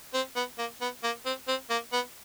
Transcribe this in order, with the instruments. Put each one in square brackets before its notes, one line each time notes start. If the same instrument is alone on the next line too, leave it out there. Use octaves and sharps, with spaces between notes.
[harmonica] C4
B3
A#3
B3
A#3
C4
C4
A#3
B3